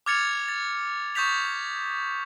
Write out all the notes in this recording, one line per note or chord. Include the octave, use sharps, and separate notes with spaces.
D6 F6 G#6 A6 C#7 F7
A6
C#6 D#6 G6 A6 B6 F7